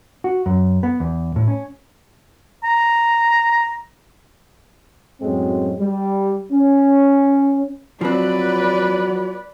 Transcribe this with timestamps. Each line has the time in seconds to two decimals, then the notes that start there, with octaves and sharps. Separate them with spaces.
0.24 F#4
0.46 F#2
0.83 B3
1.00 E2
1.36 A2
1.48 C#4
2.64 A#5
5.21 F#2 A2 F#3 G#3 C4
5.79 G3
6.52 C#4
8.01 F3 F#3 C4 F4 F#4 B4 D5